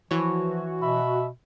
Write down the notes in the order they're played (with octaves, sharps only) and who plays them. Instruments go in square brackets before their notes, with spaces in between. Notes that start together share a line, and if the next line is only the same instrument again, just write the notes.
[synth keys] E3 C#5 [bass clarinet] F3 [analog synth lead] F#4
[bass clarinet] B2 [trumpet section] E5 B5